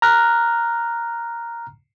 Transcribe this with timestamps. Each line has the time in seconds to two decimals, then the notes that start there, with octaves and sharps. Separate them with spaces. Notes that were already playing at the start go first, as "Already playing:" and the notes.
0.02 A#5 F6 F#6